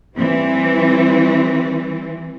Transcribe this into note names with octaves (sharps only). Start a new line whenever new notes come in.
E3 G3 C4